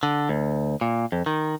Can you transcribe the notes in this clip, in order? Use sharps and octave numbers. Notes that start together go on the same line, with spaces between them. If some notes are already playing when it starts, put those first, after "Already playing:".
D3
D2
A#2
F2
D#3